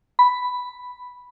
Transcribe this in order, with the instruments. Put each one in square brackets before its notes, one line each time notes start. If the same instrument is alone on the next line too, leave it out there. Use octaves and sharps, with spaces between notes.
[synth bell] B5